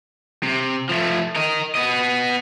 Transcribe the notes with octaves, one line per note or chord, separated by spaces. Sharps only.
C3
F3 A3
A#4 D#5
B3 D#5